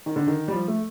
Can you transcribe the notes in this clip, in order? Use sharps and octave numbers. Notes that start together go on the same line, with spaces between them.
D#3
D3
D#3
G3
F3
A3